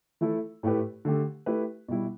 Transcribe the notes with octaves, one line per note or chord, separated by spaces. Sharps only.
E3 A3 E4 A4
A2 A3 E4 G4 B4
D3 A3 G4
A3 E4 G4 B4
B2 G3 E4